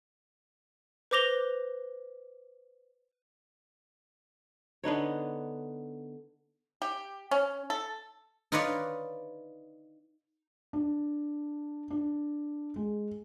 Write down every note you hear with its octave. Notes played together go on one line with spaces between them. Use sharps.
B4 C5 D6 A#6 F7 G7
D3 B3 D#4 C#5
G4
C#4
A4
D#4 F4 B4 C#5 D5
D4
D4
G#3